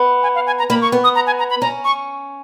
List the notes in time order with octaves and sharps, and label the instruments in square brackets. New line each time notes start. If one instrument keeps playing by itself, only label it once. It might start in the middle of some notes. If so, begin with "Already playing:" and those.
Already playing: [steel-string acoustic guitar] B3
[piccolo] G#5
F5
G#5
A#5
[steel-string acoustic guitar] A#3 [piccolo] B5
[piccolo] C#6
[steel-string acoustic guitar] B3
[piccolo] D#6
A#5
G#5
A#5
B5
[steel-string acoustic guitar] C#4 [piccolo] A#5
[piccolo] C#6